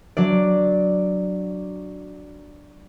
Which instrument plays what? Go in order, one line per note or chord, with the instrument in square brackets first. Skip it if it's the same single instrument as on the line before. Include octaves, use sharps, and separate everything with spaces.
[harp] F#3 D4 D5